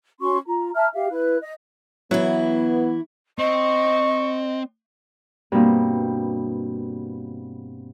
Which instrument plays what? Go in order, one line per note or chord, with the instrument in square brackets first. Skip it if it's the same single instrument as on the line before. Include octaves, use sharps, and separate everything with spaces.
[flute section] C#4 F#4 C6 C#6
F4 A#5
E5 A5 A#5 F6
G4 E5 F5
E4 B4 F#6
D#5
[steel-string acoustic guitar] E3 E4 [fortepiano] F#3 [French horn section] B3
[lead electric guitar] C4 [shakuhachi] D#5 [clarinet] C#6
[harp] G2 B2 A#3 C4